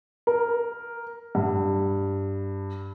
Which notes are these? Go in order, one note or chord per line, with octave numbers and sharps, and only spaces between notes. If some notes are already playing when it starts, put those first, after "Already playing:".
A#4
G2